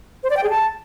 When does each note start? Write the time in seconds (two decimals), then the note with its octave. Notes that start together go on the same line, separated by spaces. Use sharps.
0.24 C5
0.30 D5
0.37 G5
0.43 G#4
0.50 A5